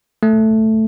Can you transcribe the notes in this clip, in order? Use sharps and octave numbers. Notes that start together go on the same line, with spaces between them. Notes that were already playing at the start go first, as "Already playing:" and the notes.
A3